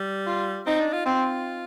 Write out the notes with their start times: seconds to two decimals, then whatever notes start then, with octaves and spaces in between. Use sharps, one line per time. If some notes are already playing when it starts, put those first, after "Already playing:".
Already playing: G3
0.26 F4
0.66 C4 D#4
0.80 D4
0.93 F4
1.06 C4 F4